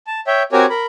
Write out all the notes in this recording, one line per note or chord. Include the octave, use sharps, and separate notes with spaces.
A5
C#5 E5 G5
C4 F#4 G4 A#4 C#5 G#5
A#4 B5